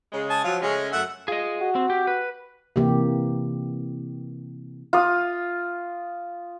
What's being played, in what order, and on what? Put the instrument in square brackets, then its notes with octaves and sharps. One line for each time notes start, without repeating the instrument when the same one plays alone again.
[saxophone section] C#3 G#3
[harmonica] G#5 A5 D#6
[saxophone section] F3 F#3 [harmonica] F4
[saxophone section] C#3 A3 C#4 [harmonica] G#3
[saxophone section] F#2 A3 [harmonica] E5 F#5
[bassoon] F4 [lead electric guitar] G#4 D#5
[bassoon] F#4
[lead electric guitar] C4
G4
B4
[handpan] C3 E3 A#3 G4
[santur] F4 D#6